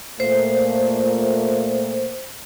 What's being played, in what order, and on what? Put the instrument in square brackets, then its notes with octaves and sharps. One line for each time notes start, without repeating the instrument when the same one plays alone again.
[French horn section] A#2 A3 A#3 [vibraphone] C5